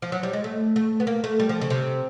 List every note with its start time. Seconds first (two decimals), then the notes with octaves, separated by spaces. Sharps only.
0.02 F3
0.12 F#3
0.23 G3
0.33 G#3
0.44 A3
0.76 A3
1.00 B3
1.07 A#3
1.24 A3
1.40 G3
1.49 F3
1.61 C#3
1.70 C3